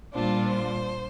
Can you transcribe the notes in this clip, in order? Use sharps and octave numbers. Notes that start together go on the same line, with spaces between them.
A#2 G3 D4 F4 C5
C5